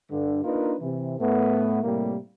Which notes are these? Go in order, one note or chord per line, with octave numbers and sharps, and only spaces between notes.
G2 D3
A#3 D4 D#4 F4 A#4 B4
C3 E3
A2 A3 B3
A2 C3 G3 A#3